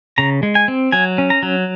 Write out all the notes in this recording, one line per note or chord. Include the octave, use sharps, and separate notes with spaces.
C#3 A#5
G#3
G#5
C4
F#3 G#5
C#4
A#5
F#3